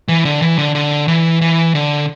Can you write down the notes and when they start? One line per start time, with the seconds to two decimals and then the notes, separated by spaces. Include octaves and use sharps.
0.08 E3
0.25 D3
0.42 E3
0.58 D3
0.75 D3
1.08 E3
1.41 E3
1.75 D3